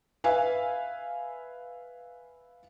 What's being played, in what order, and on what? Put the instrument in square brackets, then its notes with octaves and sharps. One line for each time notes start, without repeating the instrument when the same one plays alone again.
[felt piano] B4 E5 F5 G#5